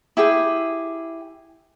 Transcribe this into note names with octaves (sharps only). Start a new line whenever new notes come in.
E4 G4 G#4 G5